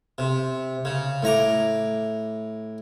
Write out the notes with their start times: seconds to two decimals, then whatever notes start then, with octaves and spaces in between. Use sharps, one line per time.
0.18 C3
0.85 C#3
1.23 A2 A#5 D6